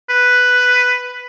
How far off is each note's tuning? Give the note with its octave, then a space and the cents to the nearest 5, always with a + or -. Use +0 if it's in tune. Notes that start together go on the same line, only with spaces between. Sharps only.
B4 +5